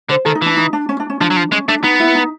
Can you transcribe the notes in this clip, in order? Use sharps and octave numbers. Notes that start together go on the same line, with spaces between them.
D3 C5
D#3 A4
D#4
E3 D4
D#4
D4
C#4
D4
C#4
F3 D4
F#3
F3
G#3 C#4
A3 D4
B3 D#4
E4
D#4